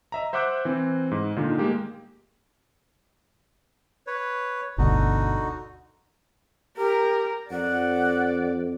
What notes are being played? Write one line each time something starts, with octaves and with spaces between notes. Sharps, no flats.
D#5 E5 A#5
C5 E5 F#5 D6 F#6 G6
E3 C4
G#2
A#2 D3 D#3 D#4 F4
G#3 A#3 G4
B4 C#5
G1 D2 B2 D3 D#4 F#4
G4 A#4
F2 D5 F#5